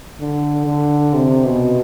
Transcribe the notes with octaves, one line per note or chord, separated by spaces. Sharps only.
D3
D3
C3
B2